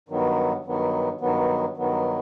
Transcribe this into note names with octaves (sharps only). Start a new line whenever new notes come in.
G2 D#3 F#3 B3
G2 D#3 F#3 B3
G2 D#3 F#3 B3
G2 D#3 F#3 B3